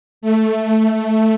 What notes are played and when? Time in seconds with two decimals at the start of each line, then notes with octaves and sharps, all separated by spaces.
0.21 A3